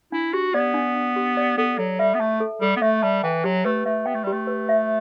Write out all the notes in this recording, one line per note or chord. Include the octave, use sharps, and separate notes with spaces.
D4 E4
F#4 G4
B3 D5
D4
D4
G4
D5
B3 A4
F#3 A4
G3 E5
B3
A3 A5
A4
G3 A4
B3
A3 E5
G3 A5
E3 G5
F#3 G4
A3 B4
A3 E5
B3 G5
A3
G3 G4
A3
B4
E5